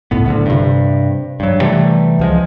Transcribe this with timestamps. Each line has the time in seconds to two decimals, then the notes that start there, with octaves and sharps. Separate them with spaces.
0.11 C#2 A2 B3
0.26 D1 D2 D3
0.46 G2 C3
1.40 G2 F#3
1.61 C3 E3 G3 A3
2.19 C#2 F3 G#3